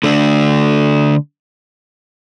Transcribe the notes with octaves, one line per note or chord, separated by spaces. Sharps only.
D3 A3 D4